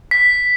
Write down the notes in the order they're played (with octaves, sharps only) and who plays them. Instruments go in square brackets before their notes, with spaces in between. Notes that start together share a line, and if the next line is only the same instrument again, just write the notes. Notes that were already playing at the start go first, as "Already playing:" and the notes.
[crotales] B6